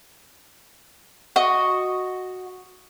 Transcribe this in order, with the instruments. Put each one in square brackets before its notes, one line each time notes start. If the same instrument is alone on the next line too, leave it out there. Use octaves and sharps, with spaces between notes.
[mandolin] F#4 D#5